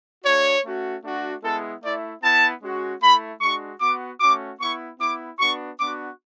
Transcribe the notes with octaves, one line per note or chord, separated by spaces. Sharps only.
A3 D4 F#4 C#5
A3 C#4 F#4
A3 D4 F#4
G#3 B3 E4 A4
A3 E4 D5
B3 E4 A5
G#3 C#4 F#4
A3 E4 B5
G#3 D4 F#4 C#6
B3 F#4 D6
A3 C#4 F#4 D6
B3 E4 C#6
B3 E4 D6
B3 D4 F#4 C#6
B3 D4 F#4 D6